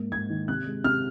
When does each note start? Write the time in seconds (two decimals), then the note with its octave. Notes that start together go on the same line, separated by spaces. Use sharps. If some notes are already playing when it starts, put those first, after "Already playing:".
Already playing: G#2 A#3
0.12 G#2 G#6
0.30 D#3
0.48 C3 F#6
0.67 G#3
0.84 C3 F6